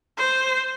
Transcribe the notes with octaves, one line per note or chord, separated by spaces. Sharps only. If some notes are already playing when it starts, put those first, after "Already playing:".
C5